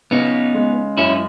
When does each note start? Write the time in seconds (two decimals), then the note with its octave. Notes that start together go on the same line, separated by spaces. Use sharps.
0.11 C#3 B3 D#4
0.54 G#3
0.97 F#2 C#4 E4